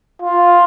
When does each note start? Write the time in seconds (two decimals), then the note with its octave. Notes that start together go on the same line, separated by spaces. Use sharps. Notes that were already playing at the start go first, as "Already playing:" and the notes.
0.22 F4